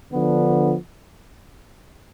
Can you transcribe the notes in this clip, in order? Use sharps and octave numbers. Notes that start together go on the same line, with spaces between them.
D3 F3 B3 D4